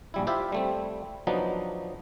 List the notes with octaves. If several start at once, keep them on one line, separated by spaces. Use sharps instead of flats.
A#1 G3 E4
E4 F4 G4 C5 E5
G3 A3 C4
F3 F#3 B3 D4 D#4